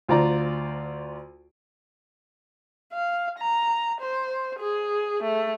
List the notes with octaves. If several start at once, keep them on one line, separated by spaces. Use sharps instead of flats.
D2 F4 C5 D5 A#5
F5
A#5
C5
G#4
A3